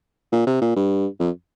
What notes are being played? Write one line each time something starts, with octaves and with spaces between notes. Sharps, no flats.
A#2
C3
A#2
G2
F2